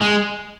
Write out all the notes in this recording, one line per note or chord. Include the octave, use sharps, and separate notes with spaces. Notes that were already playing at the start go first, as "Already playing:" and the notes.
G#3